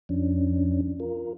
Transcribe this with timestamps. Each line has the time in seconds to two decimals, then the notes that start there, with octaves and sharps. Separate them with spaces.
0.09 F2 F3 C#4 D4
1.00 F4 A#4